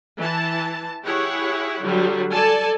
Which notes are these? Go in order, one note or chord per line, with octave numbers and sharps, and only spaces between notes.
E3 A5
E4 G4 G#4 C#5 F#5
D3 F#3 G3
A4 D5 G#5 A5